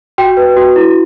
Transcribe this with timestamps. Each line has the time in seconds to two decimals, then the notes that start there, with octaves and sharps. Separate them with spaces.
0.18 F#4 G5
0.37 B4
0.57 F#4
0.76 E4